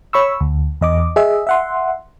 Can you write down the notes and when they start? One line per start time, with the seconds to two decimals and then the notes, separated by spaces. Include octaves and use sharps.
0.13 C#5 B5 C#6 E6
0.40 D2
0.81 E2 D#5 D6
1.16 G#4 D#5 E5
1.47 E5 F#5 C6